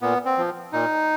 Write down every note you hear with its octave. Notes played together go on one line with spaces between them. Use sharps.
A#2 B3
C4
F3
A#2 D#4